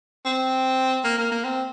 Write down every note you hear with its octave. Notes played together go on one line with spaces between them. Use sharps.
C4
A#3
A#3
A#3
C4